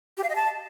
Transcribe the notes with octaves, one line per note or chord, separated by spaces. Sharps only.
G4
F5
D#5
A5